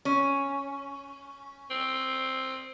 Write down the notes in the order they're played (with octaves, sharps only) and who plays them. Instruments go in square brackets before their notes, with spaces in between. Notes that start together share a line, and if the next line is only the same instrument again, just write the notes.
[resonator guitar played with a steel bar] C#4
[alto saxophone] C4